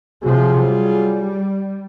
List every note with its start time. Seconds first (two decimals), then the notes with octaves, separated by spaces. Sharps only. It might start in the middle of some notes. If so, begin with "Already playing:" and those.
0.24 C3 F3 F#3 F4 G#4
0.65 G3